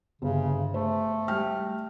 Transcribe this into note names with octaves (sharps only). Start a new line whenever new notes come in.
G1 C#3
A3 C5
G3 G5 F6